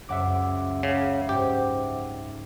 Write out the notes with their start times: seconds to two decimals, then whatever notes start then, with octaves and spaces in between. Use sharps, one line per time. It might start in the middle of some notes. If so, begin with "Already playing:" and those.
0.09 C#2 F#2 E5 F#5 D6 C7
0.83 C#3
1.29 G#2 G4